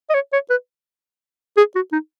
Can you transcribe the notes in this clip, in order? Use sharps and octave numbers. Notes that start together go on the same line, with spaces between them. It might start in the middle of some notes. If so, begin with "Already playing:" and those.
D#5
C#5
C#5
B4
G#4
F#4
D#4